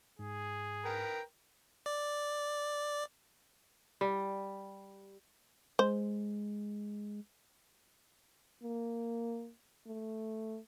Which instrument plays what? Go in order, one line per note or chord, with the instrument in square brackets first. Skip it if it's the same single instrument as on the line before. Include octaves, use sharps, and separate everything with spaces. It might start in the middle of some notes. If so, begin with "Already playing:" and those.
[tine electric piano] G#2 [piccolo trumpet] G#4
[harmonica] A#4 B4 G5
[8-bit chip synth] D5
[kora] G3
[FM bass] G#3 [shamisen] C5
[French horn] A#3
A3